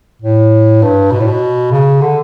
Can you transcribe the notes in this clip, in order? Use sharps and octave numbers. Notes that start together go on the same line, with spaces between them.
A2
G2
B2
A2
B2
C#3
D3